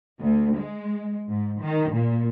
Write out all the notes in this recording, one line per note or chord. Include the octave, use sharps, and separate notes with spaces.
D2
G#3
G#2
D#3
A#2